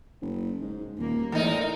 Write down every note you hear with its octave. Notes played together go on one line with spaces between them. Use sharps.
F#1
G#2
D#1 D#2 A#3
E2 A2 D#4 A#4